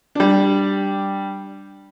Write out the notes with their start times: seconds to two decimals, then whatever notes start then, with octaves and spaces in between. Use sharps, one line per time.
0.15 G3 D4